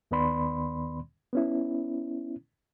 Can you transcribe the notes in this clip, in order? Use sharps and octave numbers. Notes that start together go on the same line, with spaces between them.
D#2 D#3 B3 D5 B5 C6
B3 C#4 E4